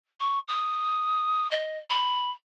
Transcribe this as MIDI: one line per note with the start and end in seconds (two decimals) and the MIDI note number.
0.20 0.39 85
0.48 1.49 87
1.51 1.78 75
1.90 2.31 83